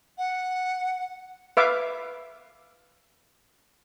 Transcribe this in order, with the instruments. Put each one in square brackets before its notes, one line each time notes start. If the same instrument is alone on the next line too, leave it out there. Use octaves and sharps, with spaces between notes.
[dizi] F#5
[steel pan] B4 E5 F5 D6